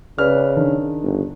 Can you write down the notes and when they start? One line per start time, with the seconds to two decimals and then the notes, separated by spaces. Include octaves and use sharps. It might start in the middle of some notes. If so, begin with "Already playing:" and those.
0.18 C#3 B4 D5 F6
0.57 D#3 D4
1.03 G1